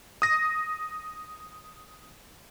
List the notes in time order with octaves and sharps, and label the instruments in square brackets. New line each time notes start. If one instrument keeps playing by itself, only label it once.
[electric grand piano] D#6 A#6